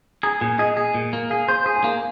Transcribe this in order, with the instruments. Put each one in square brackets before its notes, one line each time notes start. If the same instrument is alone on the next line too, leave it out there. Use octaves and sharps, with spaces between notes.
[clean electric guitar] G#4 [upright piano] A#5
[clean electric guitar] A#2 [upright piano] G#5
[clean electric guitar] G#4 [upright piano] D#5
[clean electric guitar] G#4
A#2
A#3
[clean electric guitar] G#4 [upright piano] F5
[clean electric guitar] C5
G#4
[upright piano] G#5
[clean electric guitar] A#3 [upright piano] F5